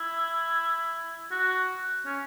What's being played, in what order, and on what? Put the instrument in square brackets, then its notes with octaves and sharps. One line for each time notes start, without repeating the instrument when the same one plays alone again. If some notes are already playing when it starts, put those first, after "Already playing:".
Already playing: [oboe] E4
F#4
C#4